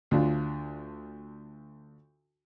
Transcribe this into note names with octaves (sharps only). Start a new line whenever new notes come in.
D2 D4 F4